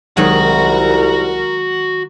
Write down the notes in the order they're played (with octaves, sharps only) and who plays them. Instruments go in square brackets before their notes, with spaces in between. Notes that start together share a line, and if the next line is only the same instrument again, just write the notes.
[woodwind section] C2 [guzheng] D#3 F#3 G#3 [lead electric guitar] F#4 F#5 [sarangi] A#4